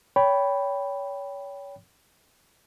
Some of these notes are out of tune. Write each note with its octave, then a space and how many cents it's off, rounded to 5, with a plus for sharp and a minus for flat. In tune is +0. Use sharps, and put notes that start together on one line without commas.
C#5 +30 G5 +0 B5 +0